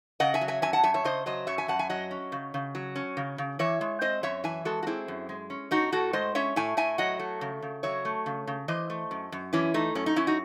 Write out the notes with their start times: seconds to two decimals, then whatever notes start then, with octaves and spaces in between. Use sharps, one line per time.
0.20 C#3 D#5 F#5
0.34 E5 G#5
0.41 F#3
0.48 E5 G#5
0.62 F#2 E5 G#5
0.73 F#5 A5
0.84 F#2 E5 G#5
0.94 C#5 E5
1.04 C#3 C5 D#5
1.26 F#3 C5 D#5
1.47 F#2 C#5 E5
1.58 E5 G#5
1.68 F#2 F#5 A5
1.79 E5 G#5
1.90 F#3 D#5 F#5
2.11 C#4
2.32 C#3
2.54 C#3
2.75 F#3
2.96 C#4
3.17 C#3
3.38 C#3
3.59 E3 C#5 E5
3.81 G#3
4.01 C4 C5 D#5
4.23 F#2 C#5 E5
4.44 E3 E5 G#5
4.65 G#3 F#4 A4
4.83 F#4
4.87 C4 E4 G#4
5.08 F#2
5.29 G#3
5.50 C#4
5.71 A2 D#4 F#4
5.92 A2 F#4 A4
6.13 G#3 C5 D#5
6.35 C#4 C#5 E5
6.56 A2 E5 G#5
6.77 A2 E5 G#5
6.98 F#3 D#5 F#5
7.19 A3
7.41 C#3
7.62 C#3
7.83 F#3 C#5 E5
8.05 A3
8.26 C#3
8.47 C#3
8.68 E3 C5 D#5
8.90 A3
9.11 F#2
9.32 F#2
9.53 E3 C#4 E4
9.74 A3 D#4
9.95 F#2 C#4
10.06 D#4
10.16 F#2 C#4 E4
10.27 D#4 F#4